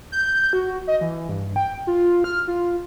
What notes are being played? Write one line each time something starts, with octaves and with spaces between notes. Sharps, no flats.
G6
F#4
D#5
E3
G2
G5
F4
F6
F4